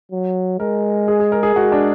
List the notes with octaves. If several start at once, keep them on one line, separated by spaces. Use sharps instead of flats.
F#3
G#3 A#4
G#4
G#4
A#4
G#4
G#3 F#4
D4